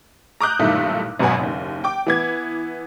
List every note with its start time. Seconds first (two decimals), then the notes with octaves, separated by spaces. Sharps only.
0.41 A#5 D6 D#6 F#6 G6
0.59 B1 G2 A#2 D#3 A3 E4
1.19 G#1 F#2 B2 B4 F#5 G#5
1.39 F#1 D#2
1.84 G5 D6
2.07 E3 B3 G#6